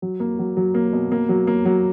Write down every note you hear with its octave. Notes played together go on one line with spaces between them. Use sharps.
F#3
A#3
F#3
F#3
A#3
B2
A#3
F#3
A#3
F#3